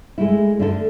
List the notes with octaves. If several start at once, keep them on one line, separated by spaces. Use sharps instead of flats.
G#3 A3 E4
D3 A3 E4 A4 A#4